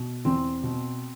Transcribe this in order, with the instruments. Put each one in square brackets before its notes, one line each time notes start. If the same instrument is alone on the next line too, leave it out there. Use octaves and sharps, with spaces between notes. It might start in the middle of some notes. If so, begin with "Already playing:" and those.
Already playing: [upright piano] B2
E2 C4
B2